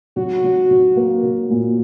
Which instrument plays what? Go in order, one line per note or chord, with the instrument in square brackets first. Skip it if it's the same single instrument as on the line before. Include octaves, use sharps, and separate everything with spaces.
[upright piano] F#3 [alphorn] F#4
[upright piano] F#3
F#3
A#3
F#3
A#2